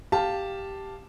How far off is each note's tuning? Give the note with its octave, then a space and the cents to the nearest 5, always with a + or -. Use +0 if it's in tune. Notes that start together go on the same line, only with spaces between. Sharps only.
G4 +0 F5 +0 A5 +0